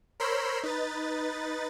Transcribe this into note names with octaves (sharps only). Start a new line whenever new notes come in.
A#4 C5 C#5 B5 C6 E6
D#4 B4 A6